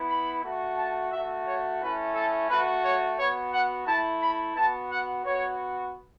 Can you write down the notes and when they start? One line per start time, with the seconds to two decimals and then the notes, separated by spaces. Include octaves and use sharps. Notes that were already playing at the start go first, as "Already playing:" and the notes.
Already playing: B3 E4
0.09 B5
0.43 A3 F#4
0.78 A5
1.12 A3 F#4 E5
1.46 C#5
1.81 A3 C#4 E4 B4
2.15 A4
2.49 A3 F#4 B4
2.84 C#5
3.18 B3 F#4 C#5
3.52 F#5
3.87 A3 E4 A5
4.21 B5
4.56 B3 F#4 A5
4.90 F#5
5.25 B3 F#4 C#5